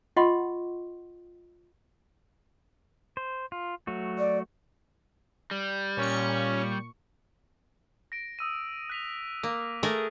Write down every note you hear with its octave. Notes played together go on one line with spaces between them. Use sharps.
F4 D#5 F#5 C6 C#6
C5
F4
F#3 A3 F#4
D5
G3
A#2 C#4 C#6
A#6 D7
D#6 E6 D#7
F#6 B6 F7
A#3
A3 G#4 A#4